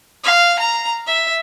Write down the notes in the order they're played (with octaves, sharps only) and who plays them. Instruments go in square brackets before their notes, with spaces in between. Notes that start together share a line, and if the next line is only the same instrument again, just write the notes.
[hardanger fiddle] F5
A#5
E5